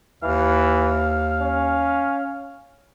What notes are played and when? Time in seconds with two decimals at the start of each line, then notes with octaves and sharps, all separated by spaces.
0.23 D#2 E3 F5
1.40 C#4